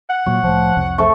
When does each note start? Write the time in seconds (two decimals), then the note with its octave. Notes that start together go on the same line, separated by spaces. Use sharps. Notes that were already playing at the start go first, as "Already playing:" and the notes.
0.10 F#5
0.26 A#2 F#3 C#5
0.43 C2 A2 F3
0.77 C2 F2 C3
0.98 F3 A3 A4 C#6